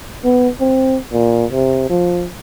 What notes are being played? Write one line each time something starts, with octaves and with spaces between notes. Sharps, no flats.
B3
C4
A#2
C3
F3